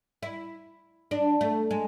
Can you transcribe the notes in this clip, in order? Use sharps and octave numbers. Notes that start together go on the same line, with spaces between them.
E4
D4
A3
G#3